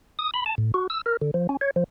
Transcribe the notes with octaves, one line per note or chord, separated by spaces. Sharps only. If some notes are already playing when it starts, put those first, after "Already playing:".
D#6
B5
A5
A2
F#4
E6
A#4
D3
F3
C#4
C#5
F3